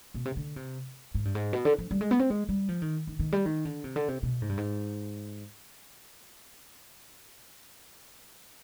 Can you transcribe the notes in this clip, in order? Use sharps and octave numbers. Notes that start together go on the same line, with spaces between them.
B2
C3
D3
C3
G#2
G2
G#2
B2
D3
F3
G3
G#3
B3
C4
G#3
G3
F3
D#3
D#3
D#3
G3
D#3
D3
C3
D3
C3
B2
G#2
G2
G#2